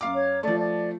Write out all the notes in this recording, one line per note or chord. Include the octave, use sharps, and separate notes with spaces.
F#2 F5 D6
C#5
F3 A3 D5
D5